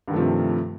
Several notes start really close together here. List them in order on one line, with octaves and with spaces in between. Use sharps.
G2 D#3 A3 F3 C3